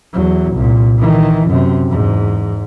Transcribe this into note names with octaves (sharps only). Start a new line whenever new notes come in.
E2 F#3
C2 A#2
D#3 E3
F#2 C3
E2 G#2